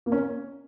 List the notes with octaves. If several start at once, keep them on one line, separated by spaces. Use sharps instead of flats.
A#3
C#4